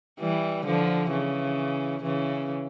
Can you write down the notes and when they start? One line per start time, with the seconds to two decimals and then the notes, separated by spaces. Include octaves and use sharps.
0.20 E3 G3
0.65 D3 F3
1.11 C#3 E3
2.03 C#3 E3